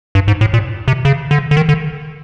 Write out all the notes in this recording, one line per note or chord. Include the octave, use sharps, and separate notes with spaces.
G2
G#2
A2
A#2
C3
C#3
D3
D3
D#3
D3